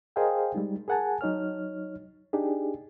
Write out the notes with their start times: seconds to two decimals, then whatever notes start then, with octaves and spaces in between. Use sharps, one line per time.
0.16 G#4 A#4 C5 D#5 F5 G5
0.55 G3 G#3 D#4
0.88 G#4 A#4 F#5 G#5 A5
1.21 F#3 D#4 C#5 F6
2.33 D4 D#4 G4 G#4